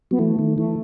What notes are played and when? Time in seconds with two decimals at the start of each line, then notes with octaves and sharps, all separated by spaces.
0.11 F#3 B3
0.19 E3 A3
0.39 D#3
0.58 E3 A3